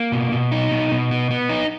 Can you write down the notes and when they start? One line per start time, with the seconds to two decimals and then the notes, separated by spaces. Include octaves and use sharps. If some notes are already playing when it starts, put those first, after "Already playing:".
Already playing: A#3
0.12 B2
0.32 B2
0.52 D#4
0.71 B2
0.91 B2
1.11 B3
1.30 B3
1.49 D#4